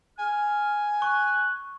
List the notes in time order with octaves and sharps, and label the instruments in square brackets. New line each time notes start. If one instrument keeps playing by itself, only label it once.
[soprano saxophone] G#5 [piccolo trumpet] F6
[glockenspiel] C#6 [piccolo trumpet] F#6